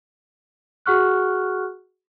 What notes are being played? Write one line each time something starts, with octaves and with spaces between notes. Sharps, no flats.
F#4 G#4 F#5 C#6 F6 F#6